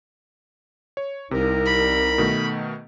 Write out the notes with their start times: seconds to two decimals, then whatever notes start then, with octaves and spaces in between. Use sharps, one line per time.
0.97 C#5
1.31 C2 C3 D#4 A#4
1.66 B5
2.18 B2 D#3 A3